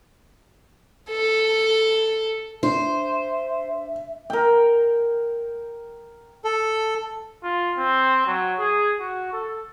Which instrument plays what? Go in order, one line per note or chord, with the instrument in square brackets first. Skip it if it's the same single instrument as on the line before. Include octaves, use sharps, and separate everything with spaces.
[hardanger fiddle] A4
[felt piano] D4 [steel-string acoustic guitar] C5 [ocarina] E5
[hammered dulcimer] A#4 G5
[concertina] A4
[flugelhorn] F4
C4
F#3
G#4
F#4
A4